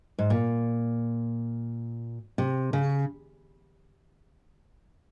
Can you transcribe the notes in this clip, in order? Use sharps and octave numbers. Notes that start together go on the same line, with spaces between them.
G#2
A#2
C3
C#3